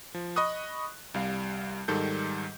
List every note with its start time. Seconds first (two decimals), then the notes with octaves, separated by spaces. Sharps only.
0.15 F3
0.36 D#5 B5 C#6 D#6 F#6
1.14 C2 G3 F5
1.88 G#2 D#3 G3 A4 G6